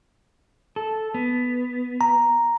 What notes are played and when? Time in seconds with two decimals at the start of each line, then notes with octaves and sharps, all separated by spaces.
0.76 A4
1.14 B3
2.01 A#5